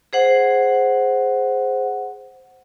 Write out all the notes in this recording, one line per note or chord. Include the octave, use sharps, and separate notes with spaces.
G#4 C5 F#5